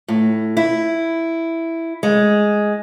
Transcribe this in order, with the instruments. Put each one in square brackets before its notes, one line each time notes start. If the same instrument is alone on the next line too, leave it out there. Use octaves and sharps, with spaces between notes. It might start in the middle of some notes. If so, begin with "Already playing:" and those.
[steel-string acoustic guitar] A2
E4
G#3